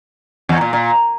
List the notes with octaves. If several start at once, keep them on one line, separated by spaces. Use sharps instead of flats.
E2
A#2
A#2